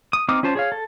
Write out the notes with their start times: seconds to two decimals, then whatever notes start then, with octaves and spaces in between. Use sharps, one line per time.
0.13 D#6
0.29 C4 D#4 D6 D#6 F6
0.43 C#4 F4 C5 A5
0.55 G#4 C#5 F5
0.72 A4